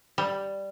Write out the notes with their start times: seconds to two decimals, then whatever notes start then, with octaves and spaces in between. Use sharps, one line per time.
0.18 G3